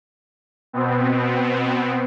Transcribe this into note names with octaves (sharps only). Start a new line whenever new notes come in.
B2 B3 C4